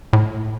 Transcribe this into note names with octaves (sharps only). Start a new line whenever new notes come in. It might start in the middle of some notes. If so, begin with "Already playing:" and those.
A2